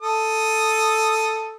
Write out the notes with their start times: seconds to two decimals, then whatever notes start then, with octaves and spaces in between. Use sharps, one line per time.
0.01 A4 D#6